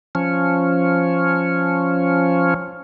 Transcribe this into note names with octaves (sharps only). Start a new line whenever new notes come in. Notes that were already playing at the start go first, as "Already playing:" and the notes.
F3 C#4